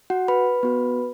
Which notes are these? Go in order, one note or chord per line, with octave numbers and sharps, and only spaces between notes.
F#4 F#5
B4 B5
B3 F#4